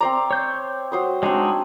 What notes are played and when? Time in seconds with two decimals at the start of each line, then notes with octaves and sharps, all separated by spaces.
0.01 C4 C5 D5 A#5
0.31 C#5 G6
0.92 F#3 C5 D#6
1.23 G#3 C4 D4 D#4 F#4